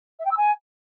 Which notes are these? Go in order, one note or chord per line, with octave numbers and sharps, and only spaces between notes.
E5
G5
E6
G#5